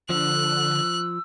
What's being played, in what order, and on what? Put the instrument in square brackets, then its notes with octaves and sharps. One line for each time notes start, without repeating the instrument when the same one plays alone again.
[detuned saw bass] D3 [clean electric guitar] F3 [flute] E6 [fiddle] F#6